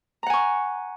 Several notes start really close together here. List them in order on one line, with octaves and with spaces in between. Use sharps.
A#5 F#5 G#5 C#6